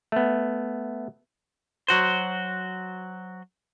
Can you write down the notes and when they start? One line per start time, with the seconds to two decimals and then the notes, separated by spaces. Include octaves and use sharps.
0.12 A3 B3
1.88 F#3 F#4 C5